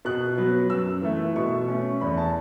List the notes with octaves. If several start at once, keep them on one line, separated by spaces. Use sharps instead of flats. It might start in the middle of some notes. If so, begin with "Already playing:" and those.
B2 F#6
F#3 B3
F#2 E6
E3 A3
B2 C#6
A3 C#4
E2 B5
A5